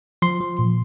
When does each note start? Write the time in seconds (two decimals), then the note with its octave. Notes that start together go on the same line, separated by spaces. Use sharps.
0.22 F3 C6
0.41 F3
0.59 A#2